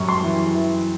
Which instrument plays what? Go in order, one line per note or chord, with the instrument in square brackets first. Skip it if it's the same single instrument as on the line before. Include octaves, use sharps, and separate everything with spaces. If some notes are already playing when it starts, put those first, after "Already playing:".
Already playing: [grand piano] F#2 G3 C#6
C6
E3
E3